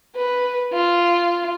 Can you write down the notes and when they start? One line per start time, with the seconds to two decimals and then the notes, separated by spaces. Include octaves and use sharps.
0.15 B4
0.73 F4